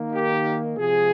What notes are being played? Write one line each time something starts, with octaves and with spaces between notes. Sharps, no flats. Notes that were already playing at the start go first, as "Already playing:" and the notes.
Already playing: D#3 A#3
G4
C3 F3 G#3 G#4